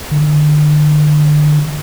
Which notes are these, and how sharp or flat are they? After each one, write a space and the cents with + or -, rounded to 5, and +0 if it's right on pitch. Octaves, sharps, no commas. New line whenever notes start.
D3 +35